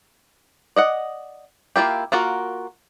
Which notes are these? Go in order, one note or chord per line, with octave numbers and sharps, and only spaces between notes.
D5 D#5 F#5
A#3 E4 F4 G4
A#3 F4 F#4 A#4